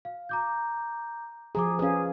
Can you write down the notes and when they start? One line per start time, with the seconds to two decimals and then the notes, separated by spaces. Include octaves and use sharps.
0.05 F5
0.29 A#5 D6 G6
1.55 F3 G#4 A#5 D6
1.79 C#4 G#4 B4 F5